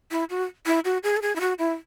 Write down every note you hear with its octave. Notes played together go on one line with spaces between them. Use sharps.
E4
F#4
E4
F#4
G#4
A4
G#4
E4
F#4
E4